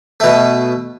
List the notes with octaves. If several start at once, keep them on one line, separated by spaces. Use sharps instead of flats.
B2 A3